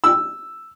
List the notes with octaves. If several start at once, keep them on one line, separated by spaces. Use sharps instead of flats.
E6